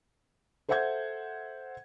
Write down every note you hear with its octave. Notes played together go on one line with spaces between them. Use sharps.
A4 C5 E5 F#5 G6 G#6